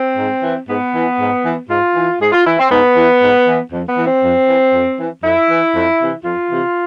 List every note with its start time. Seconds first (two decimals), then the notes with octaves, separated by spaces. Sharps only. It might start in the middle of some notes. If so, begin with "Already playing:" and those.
Already playing: C4
0.17 G#2
0.43 E3
0.68 G#2 B3
0.94 E3
1.19 G#2
1.44 E3
1.69 G#2 F4
1.95 E3
2.20 G#2 G#4
2.32 F4
2.45 E3 E4
2.59 C4
2.70 G#2 B3
2.96 E3
3.22 G#2
3.47 E3
3.72 F2
3.88 B3
3.96 E3
4.06 C4
4.23 F2
4.47 E3
4.72 F2
4.98 E3
5.23 F2 E4
5.49 E3
5.74 F2
6.00 C3 E3
6.24 F2 F4
6.50 C3 E3